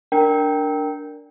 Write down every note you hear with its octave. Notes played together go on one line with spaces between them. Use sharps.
D4 A#4 G5